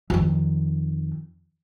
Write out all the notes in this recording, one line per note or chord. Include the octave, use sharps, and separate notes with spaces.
F2 D#3